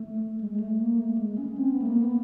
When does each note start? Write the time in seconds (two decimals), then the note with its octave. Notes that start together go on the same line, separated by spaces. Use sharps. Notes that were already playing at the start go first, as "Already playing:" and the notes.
Already playing: A3
0.41 G#3
0.51 G#3
0.60 A3
0.80 A#3
0.99 A3
1.18 G#3
1.38 C#4
1.58 C4
1.72 B3
1.82 A3
1.87 A#3
2.02 B3